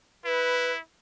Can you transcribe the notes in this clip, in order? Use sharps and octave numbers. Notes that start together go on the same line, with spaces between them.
E4 B4